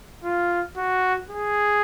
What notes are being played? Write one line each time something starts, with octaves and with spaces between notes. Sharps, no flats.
F4
F#4
G#4